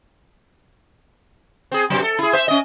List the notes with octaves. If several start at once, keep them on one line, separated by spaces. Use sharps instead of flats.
C4 G#4
G2 C3 F#3
A4
E4 G#4
C5 E5
C#4 D#5